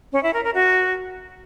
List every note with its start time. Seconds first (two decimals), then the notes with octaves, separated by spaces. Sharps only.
0.13 C#4
0.23 E4
0.33 A#4
0.44 A#4
0.54 F#4